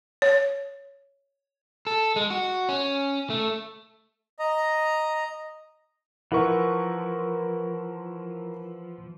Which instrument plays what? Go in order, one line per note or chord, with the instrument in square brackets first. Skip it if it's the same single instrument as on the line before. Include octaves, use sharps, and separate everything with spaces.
[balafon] C#5
[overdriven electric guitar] A4
G#3
F#4
C#4
A3
[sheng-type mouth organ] D#5 A#5
[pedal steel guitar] E3 F3 [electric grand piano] E4 A#4 C#6 [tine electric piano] B4 E5 F#5